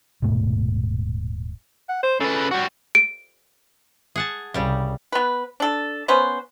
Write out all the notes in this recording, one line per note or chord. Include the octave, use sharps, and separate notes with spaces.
D#1 G#2 B2 A3
F#5
C5
C#3 A4 B4
G3 F#4 F#5
D7
G#4 F#5 A5
C2 C#3 G3 G4
B3 B4
D4 A4
B3 C#4 B4 C5